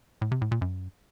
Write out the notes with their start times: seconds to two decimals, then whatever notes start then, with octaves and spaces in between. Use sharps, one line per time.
0.22 A2
0.32 C3
0.41 A2
0.51 A#2
0.61 F#2